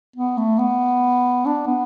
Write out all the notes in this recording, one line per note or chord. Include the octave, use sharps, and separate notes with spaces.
B3
A3
B3
D4
B3